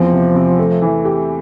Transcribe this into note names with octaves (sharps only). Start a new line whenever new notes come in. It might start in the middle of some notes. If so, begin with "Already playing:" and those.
Already playing: E2 F3 C4
C3
C3
A3
E3
G4